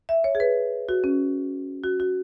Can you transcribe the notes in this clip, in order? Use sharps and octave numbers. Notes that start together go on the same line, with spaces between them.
E5
C#5
G#4
B4
F#4
C#4
F#4
F#4